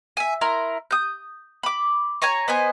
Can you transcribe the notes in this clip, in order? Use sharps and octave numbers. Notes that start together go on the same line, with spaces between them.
E5 G#5
E4 A#4 A#5 C6
D#6 G6
B5 D6
C#5 G#5 A#5 C#6
B3 C5 D#5 G#5